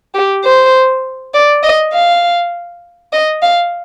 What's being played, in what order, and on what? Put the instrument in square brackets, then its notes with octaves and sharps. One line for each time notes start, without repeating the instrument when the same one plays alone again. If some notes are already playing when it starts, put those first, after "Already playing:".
[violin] G4
C5
D5
D#5
F5
D#5
F5